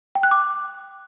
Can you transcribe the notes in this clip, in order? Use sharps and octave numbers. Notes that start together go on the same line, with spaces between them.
G5
F#6
D6